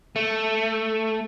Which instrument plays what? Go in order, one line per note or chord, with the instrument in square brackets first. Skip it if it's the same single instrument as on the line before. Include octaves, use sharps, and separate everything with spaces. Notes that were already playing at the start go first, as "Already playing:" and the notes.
[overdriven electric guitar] A3